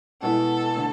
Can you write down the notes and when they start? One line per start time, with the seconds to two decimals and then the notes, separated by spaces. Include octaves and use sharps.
0.22 B2 G#3 B3 E4 A4
0.76 D3 A3